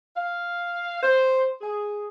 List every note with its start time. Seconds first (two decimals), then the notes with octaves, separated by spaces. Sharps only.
0.16 F5
1.02 C5
1.61 G#4